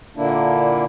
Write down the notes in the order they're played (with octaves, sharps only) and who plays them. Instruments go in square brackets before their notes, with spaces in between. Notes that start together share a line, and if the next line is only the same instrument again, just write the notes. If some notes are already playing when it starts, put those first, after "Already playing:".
[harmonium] A#2 D3 A#3 D4 E4